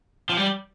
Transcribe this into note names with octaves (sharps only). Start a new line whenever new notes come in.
F3
G3